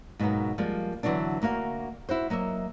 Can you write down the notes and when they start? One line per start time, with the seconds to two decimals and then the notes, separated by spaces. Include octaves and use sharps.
0.19 G#2 B2 F#3 A#3 B3
0.58 F3 G3 G#3 A#3
1.03 D3 E3 F#3 B3 D4
1.42 D2 A#3 F#4 F5
2.09 E4 F#4 C5
2.30 F#3 A#3 D#5 E5